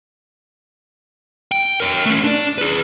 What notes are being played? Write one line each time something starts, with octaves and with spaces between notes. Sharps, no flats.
G5
A#4 C#5
A3 C#4
D4 D5
G#4 B4